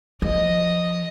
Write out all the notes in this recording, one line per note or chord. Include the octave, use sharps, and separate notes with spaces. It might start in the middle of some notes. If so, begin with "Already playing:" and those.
F3 D#5